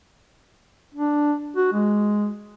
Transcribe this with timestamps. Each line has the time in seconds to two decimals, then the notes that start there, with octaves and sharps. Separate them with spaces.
0.94 D4
1.56 F#4
1.73 G#3